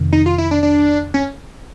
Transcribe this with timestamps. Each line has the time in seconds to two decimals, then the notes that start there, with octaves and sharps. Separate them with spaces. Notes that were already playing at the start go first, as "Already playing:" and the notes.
Already playing: F2 C3 D#3
0.13 D#4
0.26 F4
0.38 E4
0.51 D4
0.63 D4
1.14 C#4